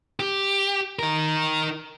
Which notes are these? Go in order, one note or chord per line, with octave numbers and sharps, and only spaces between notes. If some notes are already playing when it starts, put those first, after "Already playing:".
G4
D#4 A#4